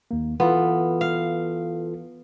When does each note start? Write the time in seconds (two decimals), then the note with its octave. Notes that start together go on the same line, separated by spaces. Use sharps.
0.11 D#2 A#3
0.40 E3 B3 F4 A4
1.01 F5